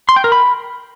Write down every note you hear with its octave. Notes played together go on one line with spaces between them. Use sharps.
C6
G5
A#4
B5